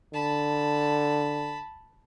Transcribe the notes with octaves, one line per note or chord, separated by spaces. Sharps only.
D3 A5 B5